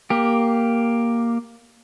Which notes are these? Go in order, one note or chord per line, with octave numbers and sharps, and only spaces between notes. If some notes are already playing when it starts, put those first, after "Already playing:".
A#3 G4